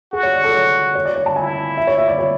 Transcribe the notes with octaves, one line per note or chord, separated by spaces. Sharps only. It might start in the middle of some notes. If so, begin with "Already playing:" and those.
F#4 G#4
C#5
D5
A4
C#5
C#5
D5
C#5
A5
E4 G#5
E5
C#5
E5
D5
C#5